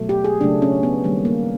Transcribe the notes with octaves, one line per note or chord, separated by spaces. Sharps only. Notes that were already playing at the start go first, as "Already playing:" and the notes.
Already playing: B2 F#3 A3
G4
G#4
C#3 F#3 A3 D4
C#4
B3
D#3 G3 A#3
A#3